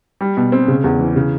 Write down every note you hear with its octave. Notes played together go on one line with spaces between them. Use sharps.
G3
B2
C4
C#3
E2
E3
C#3